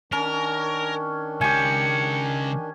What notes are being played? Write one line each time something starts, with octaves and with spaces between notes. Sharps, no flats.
D#3 C#4 D4 A#4
C#3 G#3 G4 G#5 C#7